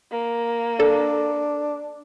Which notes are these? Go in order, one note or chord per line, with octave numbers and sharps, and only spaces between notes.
A#3
D4 A4